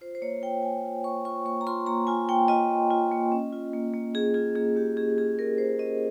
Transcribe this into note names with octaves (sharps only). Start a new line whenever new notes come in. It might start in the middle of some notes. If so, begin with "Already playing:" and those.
F4 C5
C5
A#3 C#5
F4 G5
A#3 G#5
F4
A#3 C#6
F4 C#6
A#3 C#6
A#5
F4 C6
A#3 A#5
F4 G#5
A#3 G5
F4 D#5
A#3
F4
A#3
C#4
F4
A#3
A#3
C#4 G#4
F4 G#4
A#3 G#4
A#3 G4
C#4 G#4
F4 G#4
A#3 A#4
A#3 C5
C#4 D#5